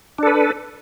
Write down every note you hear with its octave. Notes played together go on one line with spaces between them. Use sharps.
D4 A4 B4